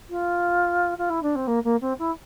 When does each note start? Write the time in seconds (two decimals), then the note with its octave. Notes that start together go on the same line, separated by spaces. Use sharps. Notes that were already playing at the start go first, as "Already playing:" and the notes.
0.10 F4
0.98 F4
1.10 E4
1.23 D4
1.36 C4
1.47 A#3
1.64 A#3
1.81 C4
1.99 E4